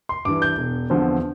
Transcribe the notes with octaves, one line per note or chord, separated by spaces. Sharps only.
C6
G2 E3 D6
G6
E1
E2 D3 F3 C4